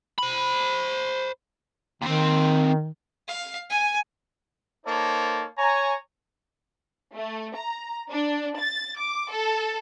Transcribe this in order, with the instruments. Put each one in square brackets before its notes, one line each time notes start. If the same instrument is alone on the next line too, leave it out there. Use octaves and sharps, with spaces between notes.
[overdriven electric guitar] C5 B5
[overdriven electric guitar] D#2 C4 [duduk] D#3
[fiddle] F5
G#5
[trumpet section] A#3 D#4 A4 C5 C#5 A5
C#5 G#5 A#5
[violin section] A3
A#5
D4
A6
D6
A4